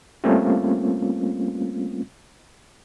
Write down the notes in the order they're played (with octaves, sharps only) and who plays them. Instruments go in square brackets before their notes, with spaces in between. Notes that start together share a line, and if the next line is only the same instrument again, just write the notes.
[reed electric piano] G3 A3 A#3 C4 C#4 F4